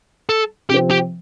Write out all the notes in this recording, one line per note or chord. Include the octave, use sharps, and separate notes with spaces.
A4
C3 F3 C4 G4
G4